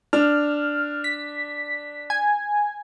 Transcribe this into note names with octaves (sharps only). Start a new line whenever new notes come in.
D4 F6
B6
G#5